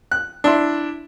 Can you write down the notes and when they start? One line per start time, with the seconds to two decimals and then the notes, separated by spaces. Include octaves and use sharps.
0.11 F#6
0.44 D4 E4 C6